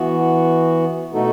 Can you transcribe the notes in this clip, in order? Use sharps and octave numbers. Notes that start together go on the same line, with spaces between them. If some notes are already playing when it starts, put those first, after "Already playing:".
Already playing: E3 B3 F#4
B2 A3 D#4 F#4 A4